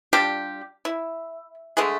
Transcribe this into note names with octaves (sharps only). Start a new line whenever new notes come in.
G3 D4 F4 G4
E4
D3 G#3 A3 G#4